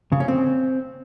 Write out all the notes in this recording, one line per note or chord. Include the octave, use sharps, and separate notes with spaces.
C#3
C#4
C4